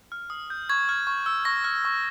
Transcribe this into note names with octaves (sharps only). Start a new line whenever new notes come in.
F6
D#6
G6
C#6 G#6
F6
C#6
E6
C#6 A#6
F6
C#6